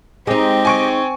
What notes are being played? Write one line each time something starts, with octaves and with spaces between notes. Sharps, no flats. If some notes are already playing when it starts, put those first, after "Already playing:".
G#3 C4 D#4 G4 D#5
G#5 C#6 D7